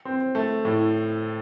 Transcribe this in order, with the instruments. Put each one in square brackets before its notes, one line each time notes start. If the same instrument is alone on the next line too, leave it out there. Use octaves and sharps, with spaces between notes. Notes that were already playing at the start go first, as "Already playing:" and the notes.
[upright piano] C4
A3
A2